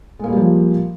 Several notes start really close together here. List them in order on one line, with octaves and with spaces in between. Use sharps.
G#3 A#3 G3 G4 F3